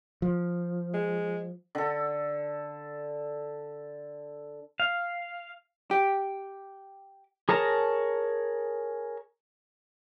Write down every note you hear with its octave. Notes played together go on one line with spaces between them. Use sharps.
F3
G#3
D3 A4
F5
G4
G#4 A#4 C#5 A5 A#5